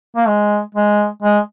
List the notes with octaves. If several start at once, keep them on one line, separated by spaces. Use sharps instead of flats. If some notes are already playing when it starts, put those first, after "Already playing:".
A#3
G#3
G#3
G#3